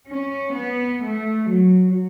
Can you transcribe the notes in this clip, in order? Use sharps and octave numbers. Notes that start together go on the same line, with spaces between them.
C#4
B3
A3
F#3